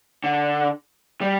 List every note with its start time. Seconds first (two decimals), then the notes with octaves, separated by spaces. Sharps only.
0.24 D3
1.21 G3